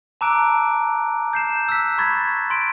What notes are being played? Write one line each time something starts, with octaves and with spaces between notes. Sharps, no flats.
A5 A#5 D6 E6 F#6 D7
G6 C7 E7
E6 F#6 B6
B5 C#6 G#6 A6 B6
C6 B6 D7